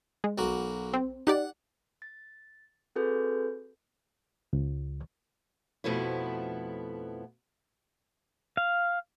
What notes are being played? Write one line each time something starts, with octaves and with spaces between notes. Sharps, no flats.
G#3
B1 A#3 F#4
C4
D#4 G4 D5 F#5
A6
C4 F#4 G#4 A4 B4 G6
C#2
F2 B2 F3 A3 B3 E4
F5